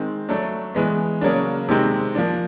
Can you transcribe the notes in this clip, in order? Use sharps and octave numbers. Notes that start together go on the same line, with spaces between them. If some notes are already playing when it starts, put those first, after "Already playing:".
Already playing: D#3 G#3 C4
F#3 A3 D4
E3 G#3 B3
C#3 F#3 A#3 D4
C3 D#3 G#3 C4
F3 A#3 D4